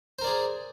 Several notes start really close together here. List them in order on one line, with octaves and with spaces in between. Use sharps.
C5 A#4 D5 G#4